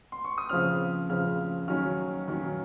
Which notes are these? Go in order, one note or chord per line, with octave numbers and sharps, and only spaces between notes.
C6
C#6
D#6
C#3 F3 C4 F6
C#3 F3 C4 F6
D#3 F#3 C#4 F6
D#3 F#3 C#4